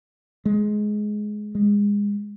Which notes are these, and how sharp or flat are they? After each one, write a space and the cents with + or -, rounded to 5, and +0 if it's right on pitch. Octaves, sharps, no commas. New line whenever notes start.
G#3 +15
G#3 -25